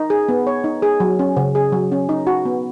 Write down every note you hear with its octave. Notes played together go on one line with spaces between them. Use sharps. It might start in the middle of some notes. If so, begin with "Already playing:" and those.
Already playing: D#4
G#4
B3
C#5
D#4
G#4
F#3
C#4
C#3
G#4
F#3
C#4
D#4
F#4
B3